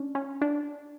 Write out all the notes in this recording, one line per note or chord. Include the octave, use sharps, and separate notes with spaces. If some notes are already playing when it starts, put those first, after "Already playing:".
Already playing: C#4 D4
C#4
D4